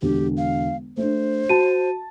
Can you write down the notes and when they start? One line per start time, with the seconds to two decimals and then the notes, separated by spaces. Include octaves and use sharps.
0.02 E1 D3 G4
0.38 F5
0.97 A3 D4 C5
1.49 F#4 A5 D#7